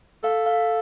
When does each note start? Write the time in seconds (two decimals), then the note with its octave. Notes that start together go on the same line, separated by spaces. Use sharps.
0.24 A4 F5
0.46 F5